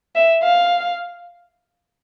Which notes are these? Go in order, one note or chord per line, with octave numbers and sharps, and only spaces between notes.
E5
F5